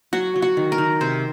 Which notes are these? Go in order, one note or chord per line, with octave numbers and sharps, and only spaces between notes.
F#3 F#4
F#3
F#4
D#3
A#4
D#3
C3 C5